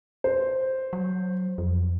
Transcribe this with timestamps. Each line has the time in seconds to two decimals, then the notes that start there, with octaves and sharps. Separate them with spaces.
0.24 C5
0.93 F#3
1.58 F2